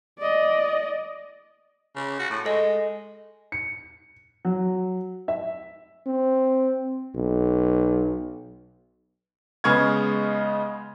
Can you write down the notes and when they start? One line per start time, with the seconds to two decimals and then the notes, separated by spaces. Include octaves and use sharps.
0.19 D5 D#5
1.96 C#3
2.19 F#4
2.30 A2
2.45 G#3 A4 D#5
3.52 C#7
4.45 F#3
5.28 E5
6.06 C4
7.15 B1
9.64 C#3 G#3 B3 C#6 F6 G#6